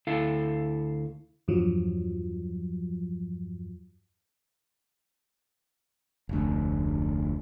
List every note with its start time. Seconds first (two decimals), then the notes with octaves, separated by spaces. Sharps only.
0.07 D2 E4 A4 F5
1.48 E2 G2 F3 F#3
6.29 F1 D2